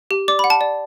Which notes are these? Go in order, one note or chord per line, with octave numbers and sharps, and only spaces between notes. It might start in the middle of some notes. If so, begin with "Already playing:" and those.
G4
D5 D6
B5
F#5
A5
D5